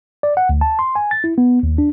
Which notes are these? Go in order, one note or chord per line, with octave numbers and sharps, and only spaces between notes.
D5
F#5
D2
A5
C6
G#5
A6
E4
B3
D#2
D4